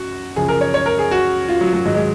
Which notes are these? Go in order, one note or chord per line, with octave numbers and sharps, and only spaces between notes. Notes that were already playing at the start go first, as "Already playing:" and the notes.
Already playing: F#2 F#4
F#2 C#3 F3 G#4
A#4
C#5
C#5
A#4
G#4
F#4
F4
F#3
F#3
G#2 D#3 F#3
G#3